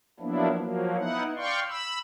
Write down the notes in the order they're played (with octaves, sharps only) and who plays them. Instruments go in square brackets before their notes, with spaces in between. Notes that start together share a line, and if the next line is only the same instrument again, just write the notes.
[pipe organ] F3 F#3 A#3 B3 D4 E4
F3 F#3 A#3
B3 D#4 E4 F#5
D5 F5 G5 C6 C#6
B5 E6